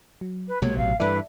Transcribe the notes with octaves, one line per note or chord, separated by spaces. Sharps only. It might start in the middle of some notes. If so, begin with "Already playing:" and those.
F#3
B4
B1 C3 F#3 G#3 A#3 B3 C#5
A1 A2 F5
G2 E3 A4 B4 D5 E5